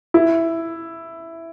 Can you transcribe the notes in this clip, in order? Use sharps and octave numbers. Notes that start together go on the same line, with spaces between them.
E4